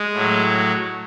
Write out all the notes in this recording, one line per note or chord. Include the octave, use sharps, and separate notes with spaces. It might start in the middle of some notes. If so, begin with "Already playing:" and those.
Already playing: G#3
A2 F#3